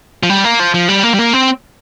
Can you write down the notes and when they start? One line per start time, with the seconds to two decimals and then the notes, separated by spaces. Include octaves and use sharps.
0.23 F3
0.30 G3
0.44 A#3
0.59 F3
0.74 F3
0.89 G3
1.04 A#3
1.14 G3
1.19 A#3
1.33 C4